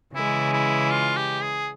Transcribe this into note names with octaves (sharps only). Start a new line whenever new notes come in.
C#3 E3 G#3 E4
E4
F4
G4
G#4